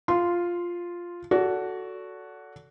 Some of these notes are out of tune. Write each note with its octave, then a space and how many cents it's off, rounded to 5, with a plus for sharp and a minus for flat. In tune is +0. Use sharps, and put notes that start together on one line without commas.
F4 +0 C6 -10
F#4 +0 A4 +0 D5 -35